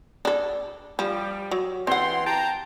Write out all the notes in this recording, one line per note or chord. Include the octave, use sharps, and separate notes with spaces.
D4 A4
F3 G3
F#3
E3 C4 F#5 G5 C6
G5 A5 A#5